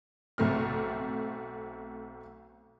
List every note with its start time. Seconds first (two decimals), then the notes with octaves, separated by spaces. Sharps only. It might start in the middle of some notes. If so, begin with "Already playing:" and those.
0.38 B1 A3 C4 F6